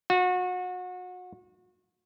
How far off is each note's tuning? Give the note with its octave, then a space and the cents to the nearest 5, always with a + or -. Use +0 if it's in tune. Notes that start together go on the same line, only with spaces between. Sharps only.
F#4 -30